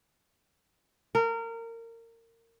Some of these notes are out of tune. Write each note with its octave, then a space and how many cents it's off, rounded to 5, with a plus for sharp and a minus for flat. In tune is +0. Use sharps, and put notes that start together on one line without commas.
A#4 -25